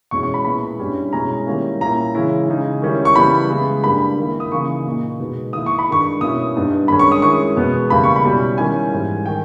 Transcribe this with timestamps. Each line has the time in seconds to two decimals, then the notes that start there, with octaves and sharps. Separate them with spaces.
0.11 E2 B2 G#3 C#4 E4 C#6
0.23 C#6
0.34 B5
0.45 A#2 G#3 B3 E4 B5
0.79 G2 G3 C#4 E4
1.12 B2 G#3 C#4 E4 A#5
1.46 D#3 G3 A#3 C#4 E4
1.80 A#2 A#3 C#4 E4 A#5
2.15 C#3 E3 G#3 C#4 E4
2.48 C#3 G#3 D#4
2.82 D#3 G3 C#4 E4
3.05 C#6
3.16 C#3 E3 G3 B3 E4 B5
3.50 C#3 G#3 B3 E4
3.84 G2 G3 A#3 B5
4.18 D#3 A#3 E4
4.40 D#6
4.51 C#3 E3 A#3 D#4 C#6
4.86 A#2 A#3 D#4
5.19 B2 G#3 B3 D#4
5.53 D#3 A#3 E4 D#6
5.66 C#6
5.79 B5
5.88 G2 D#3 G#3 D#4 C#6
6.21 B2 A#3 C#4 E4 D#6
6.55 G2 G3 B3 D#4
6.88 G2 D#3 G#3 C#4 B5
6.99 C#6
7.12 D#6
7.22 D#3 G#3 C#4 E4 C#6
7.56 E2 B2 G#3 B3
7.90 E2 C#3 G3 A#3 B5
8.04 C#6
8.16 B5
8.25 B2 G3 C#4 E4
8.58 D#3 G3 C#4 E4 G#5
8.92 G#2 E3 G3
9.26 D#3 G5